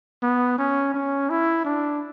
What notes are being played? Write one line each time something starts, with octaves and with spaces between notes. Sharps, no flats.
B3
C#4
C#4
E4
D4